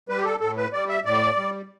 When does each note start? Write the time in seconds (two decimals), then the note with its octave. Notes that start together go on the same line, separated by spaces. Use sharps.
0.09 G3 B4
0.18 G4
0.25 A4
0.40 A2 A4
0.57 B4
0.73 G3 D5
0.89 E5
1.05 A2 D5
1.36 G3